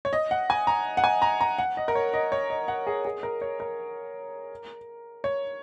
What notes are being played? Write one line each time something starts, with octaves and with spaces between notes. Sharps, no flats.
C#5
D#5
F#5
G#5
A#5
F#5
G#5
A#5
A#5
F#5
D#5
A#4
C#5
D#5
C#5
D#5
F#5
G#4
G#4
A#4
C#5
A#4
C#5